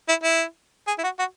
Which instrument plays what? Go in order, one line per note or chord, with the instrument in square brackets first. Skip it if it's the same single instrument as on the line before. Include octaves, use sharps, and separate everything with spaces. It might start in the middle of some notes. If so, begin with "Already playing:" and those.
[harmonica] E4
E4
G#4
E4
F#4
F#4